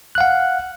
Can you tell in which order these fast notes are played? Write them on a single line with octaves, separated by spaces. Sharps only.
F#6 F5 F#5